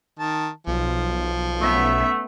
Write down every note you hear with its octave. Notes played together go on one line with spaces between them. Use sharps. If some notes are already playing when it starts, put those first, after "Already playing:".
D#3 A5
B1 F3
A3 B3 C#4 E5